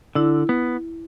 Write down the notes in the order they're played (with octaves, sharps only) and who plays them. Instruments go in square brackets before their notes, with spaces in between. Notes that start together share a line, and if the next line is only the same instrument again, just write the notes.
[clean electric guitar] D3 [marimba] E4
[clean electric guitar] B3